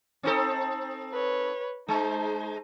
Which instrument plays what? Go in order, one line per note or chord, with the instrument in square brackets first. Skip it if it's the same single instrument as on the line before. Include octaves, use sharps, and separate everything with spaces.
[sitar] C4 D#4 A4
[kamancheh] B4 C#5
[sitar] G#3 [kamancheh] D#4 C5